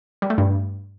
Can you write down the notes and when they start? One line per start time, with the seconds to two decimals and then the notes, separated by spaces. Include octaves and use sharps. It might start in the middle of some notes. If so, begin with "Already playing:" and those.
0.22 G3
0.30 A3
0.38 G2